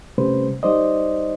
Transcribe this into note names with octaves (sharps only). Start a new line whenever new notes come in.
C3 G3 A3 C#4 B4 C5
G3 D#4 C5 D5 D#5